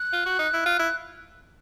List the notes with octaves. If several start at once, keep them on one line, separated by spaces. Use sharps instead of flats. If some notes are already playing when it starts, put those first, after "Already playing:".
Already playing: F#6
F4
F#4
D#4
E4
F4
E4